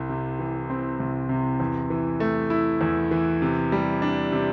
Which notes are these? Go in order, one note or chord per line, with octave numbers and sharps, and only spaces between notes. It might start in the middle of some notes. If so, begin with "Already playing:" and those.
Already playing: C2
C3
E3
C4
C2
C3
E2
E3
A3
E4
E2
E3
C3
G3
D4
C3